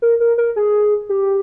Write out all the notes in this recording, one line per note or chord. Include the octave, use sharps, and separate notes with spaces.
A#4
A#4
A#4
G#4
G4